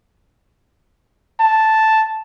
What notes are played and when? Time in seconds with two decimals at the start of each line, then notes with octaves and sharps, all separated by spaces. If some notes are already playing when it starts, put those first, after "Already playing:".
1.40 A5